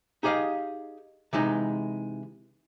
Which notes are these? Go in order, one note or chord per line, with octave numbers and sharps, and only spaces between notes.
D#4 G4 G#4 D#5 F5
C3 E3 G#3 D#4